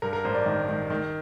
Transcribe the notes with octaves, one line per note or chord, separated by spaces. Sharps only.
G2 A#4
A#4
A1 C5
D5
D#3
D#3
D#3